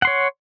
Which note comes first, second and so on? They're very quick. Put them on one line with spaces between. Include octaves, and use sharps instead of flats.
F#5 C6 C#5